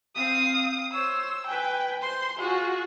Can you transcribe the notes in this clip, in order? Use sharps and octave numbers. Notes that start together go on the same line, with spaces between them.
C4 F5 D#6
C5 C#5 E6
B4 G5 G#5
C5 C6
F4 F#4 G#4